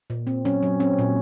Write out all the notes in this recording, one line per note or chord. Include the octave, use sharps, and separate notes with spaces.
A#2
C4
F#3 C#4
F#3
C4 C#4
A#2